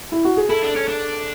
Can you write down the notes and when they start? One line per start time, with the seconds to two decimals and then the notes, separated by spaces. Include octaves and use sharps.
0.12 E4
0.25 F#4
0.37 G#4
0.49 E4 A4
0.62 D4
0.76 C#4
0.88 D4